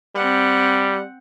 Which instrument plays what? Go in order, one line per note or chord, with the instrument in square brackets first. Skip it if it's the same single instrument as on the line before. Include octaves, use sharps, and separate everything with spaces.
[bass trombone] G3 [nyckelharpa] C4 F#5